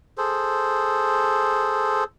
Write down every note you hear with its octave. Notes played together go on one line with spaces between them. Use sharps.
G#4 A4 C5